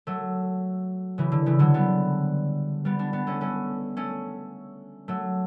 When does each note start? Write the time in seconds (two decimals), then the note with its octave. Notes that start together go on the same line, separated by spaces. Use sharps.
0.07 F#3 A3
1.18 C#3 E3
1.32 D3
1.46 C#3 E3
1.59 D3 F#3
1.74 G3 B3
2.85 G3 B3
2.99 B3 D4
3.13 B3 D4
3.27 A3 C#4
3.41 A3 C#4
3.97 A3 C#4
5.08 F#3 A3